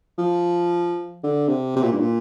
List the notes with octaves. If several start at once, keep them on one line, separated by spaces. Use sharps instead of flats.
F3
D3
C3
C3
A#2
G2
A#2